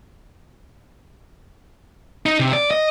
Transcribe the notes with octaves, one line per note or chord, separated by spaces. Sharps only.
D#4
C3
D5
D#5